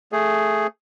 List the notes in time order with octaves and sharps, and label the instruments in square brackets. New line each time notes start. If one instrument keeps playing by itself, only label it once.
[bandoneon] A3 G#4